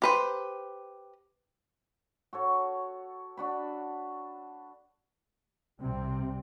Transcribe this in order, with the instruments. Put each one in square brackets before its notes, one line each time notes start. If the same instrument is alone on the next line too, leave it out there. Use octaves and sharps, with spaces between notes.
[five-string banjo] G4 B4 C5
[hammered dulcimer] F#4 A4 C#5
D4 F#4 B5
[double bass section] C2 C3 G3 C4